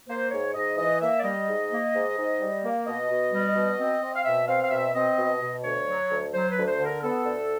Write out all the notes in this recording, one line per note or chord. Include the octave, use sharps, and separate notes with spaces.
A#3 C5
G#2 C#5
G#2 D#5
E3 D#5
A#3 E5
D5
G3 D#5
G#2
A#3
G#2
G#2
G3
A#3
B2 D#5
B2
G3
B2
C4
C4
F5
B2 E5
C4 F5
F5
B2 E5
C4 D#5
B2
B2
D2 C#5
F#3
D2
F#3 C5
B4
D2
C5
D3
A#4
B3 A4
D2